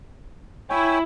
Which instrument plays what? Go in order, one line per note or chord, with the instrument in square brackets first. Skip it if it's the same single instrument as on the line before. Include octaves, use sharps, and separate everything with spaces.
[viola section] E4 [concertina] C#5 G5 G#5